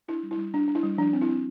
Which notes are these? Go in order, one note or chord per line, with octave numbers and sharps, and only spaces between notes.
D4 E4
G3
E4
G3
D4
D4
E4
G3
F3 D4
C4
E4
C4